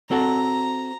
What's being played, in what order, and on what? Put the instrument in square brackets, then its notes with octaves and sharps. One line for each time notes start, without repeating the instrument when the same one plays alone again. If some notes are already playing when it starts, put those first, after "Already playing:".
[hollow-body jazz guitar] C4 F#4 A4 [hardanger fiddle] A#5